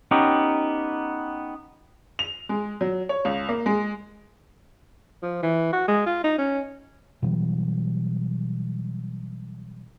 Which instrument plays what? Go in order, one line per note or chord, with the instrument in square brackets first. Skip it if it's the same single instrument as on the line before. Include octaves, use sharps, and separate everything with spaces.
[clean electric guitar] B3 C#4 D#4 G4
[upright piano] F7
G#3
F#3
C#5
C#2
A#3
G#3
[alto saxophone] F3
E3
F#4
G#3
F4
D#4
C#4
[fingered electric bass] B2 E3 F#3 G3